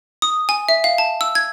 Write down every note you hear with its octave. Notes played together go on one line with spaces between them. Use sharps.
D#6
G#5
E5
F5
A5
E6
G#6